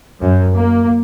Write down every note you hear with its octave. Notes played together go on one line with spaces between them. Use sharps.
F#2
A#3